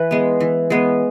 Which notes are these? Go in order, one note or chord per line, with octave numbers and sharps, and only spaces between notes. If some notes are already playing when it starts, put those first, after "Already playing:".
Already playing: E3 B4
G#3 B3
E3
G#3 B3